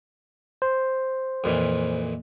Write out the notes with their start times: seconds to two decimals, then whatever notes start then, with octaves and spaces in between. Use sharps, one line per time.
0.62 C5
1.44 F2 A#2 E3